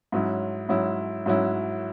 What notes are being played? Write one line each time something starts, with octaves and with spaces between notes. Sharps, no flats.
G#2 F#3 C#4 E4
G#2 F#3 C#4 E4
G#2 F#3 C#4 E4